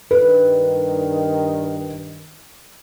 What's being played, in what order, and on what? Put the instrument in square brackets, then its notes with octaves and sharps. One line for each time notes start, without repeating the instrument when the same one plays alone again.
[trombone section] G2 D#3 [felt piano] B4